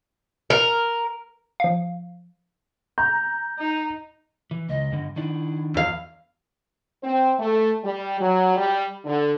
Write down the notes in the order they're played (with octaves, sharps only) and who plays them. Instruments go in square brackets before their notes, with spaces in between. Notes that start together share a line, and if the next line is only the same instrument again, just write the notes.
[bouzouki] A#4
[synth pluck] F3 F5
[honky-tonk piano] A#5 [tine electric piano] G6
[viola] D#4
[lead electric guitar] E3
[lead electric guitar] C#2 [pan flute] D#5
[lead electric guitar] G2 D3
[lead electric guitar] D#3 D4 [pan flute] E4
[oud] E2 F5
[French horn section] C4
A3
G3
F#3
G3
D3